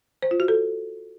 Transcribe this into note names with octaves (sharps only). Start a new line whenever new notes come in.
C5
F4
F#4
A4